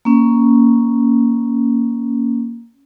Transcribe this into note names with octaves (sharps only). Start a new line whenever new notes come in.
A#3 C#4